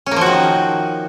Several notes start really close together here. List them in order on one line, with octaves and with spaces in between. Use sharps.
C#4 A#3 F3 F#4 D#3